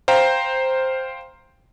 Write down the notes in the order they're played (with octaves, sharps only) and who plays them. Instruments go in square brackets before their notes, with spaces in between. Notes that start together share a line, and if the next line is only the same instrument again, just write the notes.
[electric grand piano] C5 F5 G5 A#5